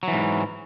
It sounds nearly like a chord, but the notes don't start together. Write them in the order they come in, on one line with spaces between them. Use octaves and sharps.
F#3 E3 G#2